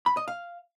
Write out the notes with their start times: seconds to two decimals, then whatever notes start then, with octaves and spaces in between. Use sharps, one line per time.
0.06 B5
0.17 D#5
0.28 F5